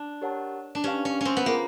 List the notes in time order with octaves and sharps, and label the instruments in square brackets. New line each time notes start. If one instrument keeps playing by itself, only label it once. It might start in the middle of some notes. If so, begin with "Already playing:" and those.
Already playing: [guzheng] D4
[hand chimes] G4 A#4 C#5 F#5 A5
[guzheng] D4
[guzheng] C#4 [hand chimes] G4 B4 D5 F5
[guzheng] C#4
C4 C#4
B3
[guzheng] A#3 [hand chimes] F4 G#4 B4